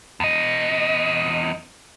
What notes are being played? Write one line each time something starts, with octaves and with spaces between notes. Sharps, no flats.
E2 D#5